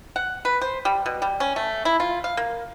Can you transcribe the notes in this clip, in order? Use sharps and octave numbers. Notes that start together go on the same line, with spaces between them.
F#5
B4
C5
G3
B2
G3
C#4
A3
E4
F4
F5
A#3